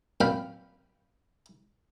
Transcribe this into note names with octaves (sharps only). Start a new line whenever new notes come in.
F#2 A#2 C4 F5 G5 B5